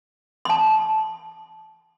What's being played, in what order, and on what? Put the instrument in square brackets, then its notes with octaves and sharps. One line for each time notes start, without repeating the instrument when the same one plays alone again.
[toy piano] A5 C6